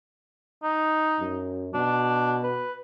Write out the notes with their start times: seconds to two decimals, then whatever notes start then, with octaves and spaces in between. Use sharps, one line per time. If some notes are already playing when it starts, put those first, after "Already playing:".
0.63 D#4
1.20 F#2
1.74 B2 D4
2.44 B4